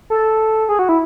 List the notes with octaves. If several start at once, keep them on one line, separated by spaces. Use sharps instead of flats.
A4
G#4
F#4
E4